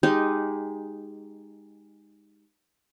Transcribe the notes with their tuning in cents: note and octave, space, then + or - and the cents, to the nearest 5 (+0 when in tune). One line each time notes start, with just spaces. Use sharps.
G#3 -15 D#4 +0 G4 -10